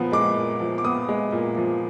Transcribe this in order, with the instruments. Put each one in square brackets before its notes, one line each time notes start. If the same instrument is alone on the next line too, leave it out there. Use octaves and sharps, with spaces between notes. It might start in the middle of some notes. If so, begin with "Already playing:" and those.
Already playing: [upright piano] A#2 F3 B3
G#3 D6
A#2
F3
D6
B3 D#6
G#3
A#2
F3